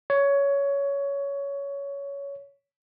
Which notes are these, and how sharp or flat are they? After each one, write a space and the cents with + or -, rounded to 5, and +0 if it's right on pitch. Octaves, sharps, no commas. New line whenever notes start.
C#5 +15